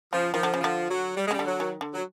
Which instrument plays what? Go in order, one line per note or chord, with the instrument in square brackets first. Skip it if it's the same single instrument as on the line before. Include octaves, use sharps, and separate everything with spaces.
[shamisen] C#3 [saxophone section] F3
[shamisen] D#3 [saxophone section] F3
[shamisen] D3
C#3
[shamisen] D3 [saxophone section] F3
[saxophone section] F#3
G3
G#3
[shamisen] C#3 [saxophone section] G3
[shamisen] D3
[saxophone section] F#3
[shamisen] D#3
D3
[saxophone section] F#3